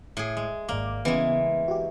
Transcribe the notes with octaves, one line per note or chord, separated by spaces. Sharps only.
A2 G#4
G#3
G#1 A#3 D5 D6
C#3 E3 G#3 B3
F#4 G4